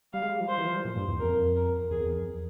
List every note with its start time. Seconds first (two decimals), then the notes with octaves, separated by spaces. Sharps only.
0.13 G3 F5
0.23 G#3
0.31 G3
0.40 F3
0.49 C5
0.58 E3
0.67 F3
0.75 G3
0.85 A#2
0.96 G2
1.08 E2
1.20 F2 A#4
1.56 A#4
1.91 E2 G#4
2.00 F2
2.09 E2
2.18 F2